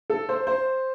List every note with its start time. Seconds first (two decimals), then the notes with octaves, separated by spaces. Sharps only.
0.10 A4
0.29 C5
0.47 C5